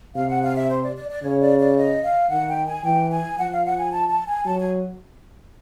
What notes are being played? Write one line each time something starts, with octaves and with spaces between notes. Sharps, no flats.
C3 F5
F#5
F5
E5
C5
D5
D5
D5
C#3 C#5
D5
D5
D#5
F5
D#3 F#5
G5
G#5
E3 G5
G#5
F3 F#5
F5
F#5
G#5
A5
A5
G#5
F#3 A5
G#5